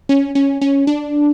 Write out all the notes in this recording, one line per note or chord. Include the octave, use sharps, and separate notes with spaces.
C#4
C#4
C#4
D4